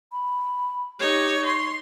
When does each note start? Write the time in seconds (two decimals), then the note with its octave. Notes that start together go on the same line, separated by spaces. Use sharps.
0.12 B5
1.00 D#4 G4 C#5
1.46 C6 C#6